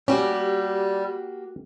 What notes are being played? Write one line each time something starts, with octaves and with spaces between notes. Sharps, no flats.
G3 A#3 C#4 F#4 G4